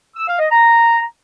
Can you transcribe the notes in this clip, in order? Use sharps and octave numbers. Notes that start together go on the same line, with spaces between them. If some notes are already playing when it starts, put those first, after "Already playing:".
E6
F5
D#5
A#5